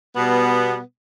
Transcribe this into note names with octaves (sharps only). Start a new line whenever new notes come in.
B2 G3 B3